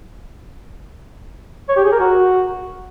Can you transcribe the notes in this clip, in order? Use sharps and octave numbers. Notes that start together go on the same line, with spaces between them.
C#5
G4
G#4
A#4
F#4